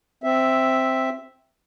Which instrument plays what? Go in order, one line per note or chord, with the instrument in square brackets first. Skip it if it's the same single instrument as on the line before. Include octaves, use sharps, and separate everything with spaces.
[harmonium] C4 E5